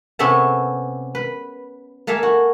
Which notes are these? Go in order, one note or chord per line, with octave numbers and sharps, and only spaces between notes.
C3 B3 C#4 A4 E5 A5
B4
A#3 A4 E5 F5 G#5
F#4